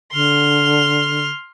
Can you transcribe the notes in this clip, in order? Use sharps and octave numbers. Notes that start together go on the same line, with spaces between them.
D3 C6 F6